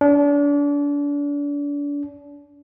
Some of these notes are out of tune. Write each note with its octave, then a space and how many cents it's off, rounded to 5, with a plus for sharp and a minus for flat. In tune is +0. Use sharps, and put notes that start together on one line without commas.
D4 -35